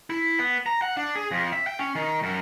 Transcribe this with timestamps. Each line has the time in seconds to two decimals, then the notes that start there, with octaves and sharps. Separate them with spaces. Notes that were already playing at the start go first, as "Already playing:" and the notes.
0.10 E4
0.39 B3
0.66 A#5
0.82 F#5
0.97 D4
1.15 G#4
1.31 F2
1.53 E5
1.67 G5
1.79 C#4
1.95 D#3
2.23 F#2